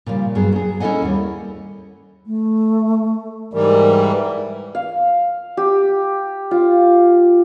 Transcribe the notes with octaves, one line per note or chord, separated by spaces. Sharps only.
A#2 C#3 F3 G3
G2 F#3 B3 G#4
F#3 G#4
C#4 E4 A4 D#5 F#5 G#5
D#2 G3
A3
G#2 E3 G3 A#4
F5
G4
F4